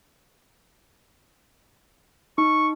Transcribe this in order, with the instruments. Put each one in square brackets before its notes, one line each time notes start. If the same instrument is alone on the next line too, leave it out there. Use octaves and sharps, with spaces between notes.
[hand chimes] D#4 [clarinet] C#6